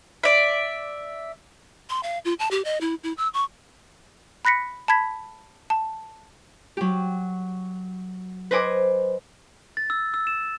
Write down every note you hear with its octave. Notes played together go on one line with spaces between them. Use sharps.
D5 E5
C6
F5
F4
A5
G4
D#5
E4
E4
E6
C#6
B5 F#6 A#6 B6 C#7
A5 B5 G#6 B6
A5
F#3 G4
B4 C5 D#5 G#5 D6
A6
E6
E6
E7